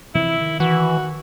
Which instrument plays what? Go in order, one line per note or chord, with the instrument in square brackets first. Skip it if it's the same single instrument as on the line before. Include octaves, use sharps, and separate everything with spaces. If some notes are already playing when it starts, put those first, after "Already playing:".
[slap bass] C3 E3 F3 [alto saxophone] E4
[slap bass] D#3
[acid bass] E3 [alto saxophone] F#4